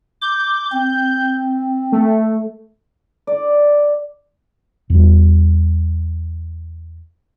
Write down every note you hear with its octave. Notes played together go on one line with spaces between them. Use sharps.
D6 G6
C4
A3
D5
E2 G3